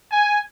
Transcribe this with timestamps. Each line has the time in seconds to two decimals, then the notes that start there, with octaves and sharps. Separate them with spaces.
0.11 G#5